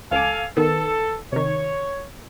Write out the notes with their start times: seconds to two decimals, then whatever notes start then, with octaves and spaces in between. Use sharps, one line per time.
0.12 C#2 A4 F5 G#5 D6
0.57 D#3 B3 A4
1.32 C3 D#3 C#5